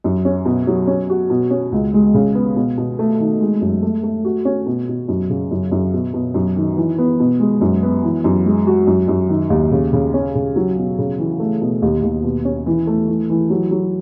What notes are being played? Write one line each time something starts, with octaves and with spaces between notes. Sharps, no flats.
F#2
C#4
B2
F#3
C#4
F#4
B2
C#4
C#2
G#3
C#3
B3
B2
B2
A3
D#3
G#3
F#2
A3
A3
F#4
C#4
B2
B2
F#2
C#3
F#2
F#2
B2
B2
F#2
D#3
E3
B3
B2
G#3
F#2
B3
E3
F#2
G#3
F#4
F#2
F#2
D#3
D#2
C#3
C#3
C#4
C#3
F#3
B2
C#3
E3
A3
B2
D#2
D#2
B2
C#4
E3
A3
E3
E3
F#3
F#3